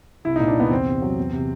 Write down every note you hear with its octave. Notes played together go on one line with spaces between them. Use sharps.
C2 E4
D#4
A#2
D4
C2 B3
E2 C4
C3
F#3
E2
C3